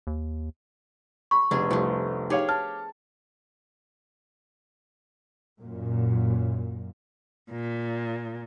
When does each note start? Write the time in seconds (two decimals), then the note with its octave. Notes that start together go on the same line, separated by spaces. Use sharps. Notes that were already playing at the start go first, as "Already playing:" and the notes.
0.07 D#2
1.31 B5 C#6
1.51 F1 B3 D4 G#4
1.71 C2 F3 A3
2.30 D#4 G4 G#4 C#5 F5
2.49 A5 F6
5.61 F#2 A#2
7.51 A#2